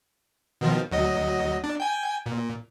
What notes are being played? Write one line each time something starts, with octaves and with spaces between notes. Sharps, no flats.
B2 D#3 F3
D2 F#3 D#5
D4
G5 G#5
A#2